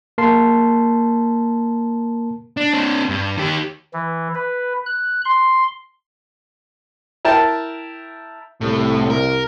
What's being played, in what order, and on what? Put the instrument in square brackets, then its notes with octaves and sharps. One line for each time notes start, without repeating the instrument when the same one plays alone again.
[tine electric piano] A#3 A#4 A5 C6 C7
[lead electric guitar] D4
C4 D4
G2
D#3 G4
[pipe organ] E3
B4
F#6
C6
[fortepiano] E4 A#4 G5 A5
[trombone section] C2 [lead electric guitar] A2
[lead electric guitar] A#4